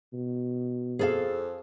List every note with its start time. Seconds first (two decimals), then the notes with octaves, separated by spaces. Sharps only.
0.13 B2
0.99 F2 G#4 A4 F5